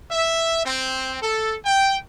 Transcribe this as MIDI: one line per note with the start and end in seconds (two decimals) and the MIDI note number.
0.11 0.61 76
0.64 1.15 60
1.21 1.56 69
1.65 1.97 79